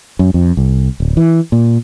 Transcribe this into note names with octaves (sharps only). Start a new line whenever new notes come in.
F#2
F2
C2
D1
E3
A#2